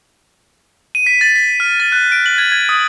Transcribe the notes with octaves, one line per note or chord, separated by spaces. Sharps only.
D#7
B6
A6
B6
F6
A6
F#6
D7
F#7
G#6
G#6
D#6